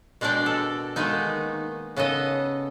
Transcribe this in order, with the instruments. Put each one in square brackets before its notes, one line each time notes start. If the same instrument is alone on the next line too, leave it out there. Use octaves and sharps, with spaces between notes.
[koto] B2 G#3 D4 A#4 D5 G5
A4
D#3 G#3 A#3 B3 D#4
C#3 B3 A4 D#5